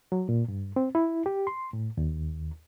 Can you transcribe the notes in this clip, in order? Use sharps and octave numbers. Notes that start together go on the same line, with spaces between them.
F#3
A#2
G2
C4
E4
G4
C6
A2
D#2